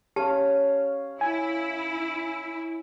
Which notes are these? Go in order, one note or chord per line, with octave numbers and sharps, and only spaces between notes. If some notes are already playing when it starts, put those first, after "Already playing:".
C#4 G4 F5 A5
E4 G#5